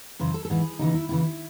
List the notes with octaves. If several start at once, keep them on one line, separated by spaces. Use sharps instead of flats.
F#2 C#3 E3 C5
A4
A4
G#2 E3 G#4
D#2 C#3 E3 D#4
E4
D#2 C#3 E3 E4